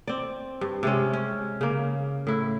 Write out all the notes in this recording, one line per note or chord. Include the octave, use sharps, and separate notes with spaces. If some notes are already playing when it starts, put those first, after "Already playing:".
C4 D5
G2
C3 G#3 C#4
C#4
C#3 A#3
A2 E4